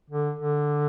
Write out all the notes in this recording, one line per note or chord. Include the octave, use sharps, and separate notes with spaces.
D3
D3